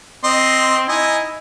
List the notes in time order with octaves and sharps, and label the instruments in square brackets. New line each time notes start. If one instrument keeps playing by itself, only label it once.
[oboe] C4 [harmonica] D#5 C6
[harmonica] D#4 D#5 G#5 [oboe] E4